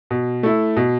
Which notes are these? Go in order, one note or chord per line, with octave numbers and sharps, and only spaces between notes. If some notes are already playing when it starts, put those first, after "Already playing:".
B2
A3 E4
B2